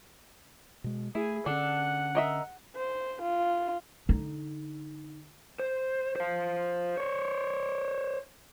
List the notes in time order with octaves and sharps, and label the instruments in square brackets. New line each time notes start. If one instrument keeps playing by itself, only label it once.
[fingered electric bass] B2 G#3
[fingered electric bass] A3 [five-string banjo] E4 [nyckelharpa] G#4
[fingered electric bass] D3 C#4 [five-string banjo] D4 A4 [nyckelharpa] F#5
[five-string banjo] A#4 D#5 E5
[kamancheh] C5
F4
[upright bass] D3 D#4
[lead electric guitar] C5
C5 F5
C5 C#5